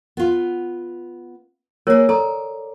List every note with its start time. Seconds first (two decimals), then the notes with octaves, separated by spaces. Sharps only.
0.17 B3 F4
1.87 A#3 G#4 A#4 C#5
2.09 A4 D5 A#5